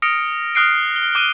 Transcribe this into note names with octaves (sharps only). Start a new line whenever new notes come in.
D#6 F6 A#6 C#7 D7
D#6 F6 F#6 C7 D7
G7
D6 F#6 D#7 G7